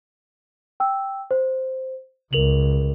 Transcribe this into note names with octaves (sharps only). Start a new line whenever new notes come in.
G5 E6
C5
C#2 A#4 F7 F#7